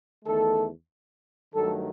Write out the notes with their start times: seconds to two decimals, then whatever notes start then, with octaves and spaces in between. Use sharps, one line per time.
0.25 E2 D#3 A3 A4
1.54 G2 D#3 F#3 A3 A4